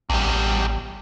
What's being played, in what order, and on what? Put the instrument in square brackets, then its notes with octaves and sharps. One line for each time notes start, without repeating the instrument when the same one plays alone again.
[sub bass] A1 [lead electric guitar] E2 G3